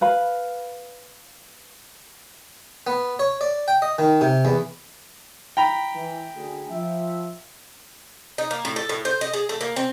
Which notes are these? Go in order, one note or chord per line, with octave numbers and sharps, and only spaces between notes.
B4 F5 B5
B3
C#5
D5
G5
D#5
D#3
C3
E2
G5 A#5 B5
E3
D2 G#4
F3 E5
D#4
A#3
A2
A4
A2
C5
D#5
G#4
A3
A#3
C4